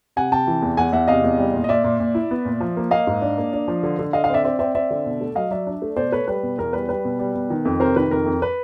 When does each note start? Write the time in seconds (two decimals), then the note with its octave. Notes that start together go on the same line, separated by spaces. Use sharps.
0.16 C3 F#5 G#5
0.32 C3 G5 A5
0.47 E3
0.62 E2
0.77 E2 F#5 G#5
0.92 E2 E5 F#5
1.07 C3 D#5 F5
1.24 E2
1.38 G3
1.54 A#2
1.64 D#5
1.69 A#2 D5 E5
1.84 A#2
2.00 A#2
2.14 E4
2.31 B3
2.45 A#2
2.60 F3
2.77 A#3
2.91 A#3 D#5 F5
3.07 G#2
3.21 D4
3.38 A#3
3.53 D4
3.68 F3
3.83 D3
3.99 D3
4.13 D3 D#5 F5
4.24 D#5 F5
4.30 C4 D5 E5
4.44 C4 D5 E5
4.59 C4 D5 E5
4.75 C4 D5 E5
4.91 D3
5.06 B2
5.21 A3
5.35 F#3 D#5 F5
5.51 F#3 D5 E5
5.67 D4
5.82 A3
5.97 B2 C5 D5
6.12 A3 B4 C#5
6.28 G3 B4
6.43 B2
6.58 E2 A#4
6.73 G3 B4
6.89 G3 B4
7.05 B2
7.19 G3
7.35 B2
7.50 D#3
7.65 F2
7.80 C3 A#4 C5
7.96 D#3 B4
8.11 F2 A#4
8.26 F2
8.42 B4